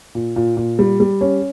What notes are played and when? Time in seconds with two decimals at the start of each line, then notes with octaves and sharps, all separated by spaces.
0.15 A#2
0.36 A#2
0.57 A#2
0.79 G3
1.00 G3
1.21 C#4